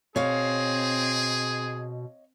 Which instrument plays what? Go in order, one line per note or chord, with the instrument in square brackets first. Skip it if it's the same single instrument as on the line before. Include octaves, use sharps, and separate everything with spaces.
[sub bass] B2 [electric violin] C4 [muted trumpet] G#4 [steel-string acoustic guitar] C#5 D#5 F5